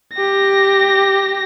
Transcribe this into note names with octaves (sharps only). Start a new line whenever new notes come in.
G4 A#6